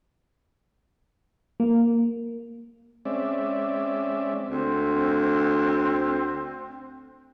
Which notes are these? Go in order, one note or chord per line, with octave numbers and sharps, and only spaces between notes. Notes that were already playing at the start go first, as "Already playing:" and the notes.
A#3
G#3 C4 C#4 D5 E5
D2 C4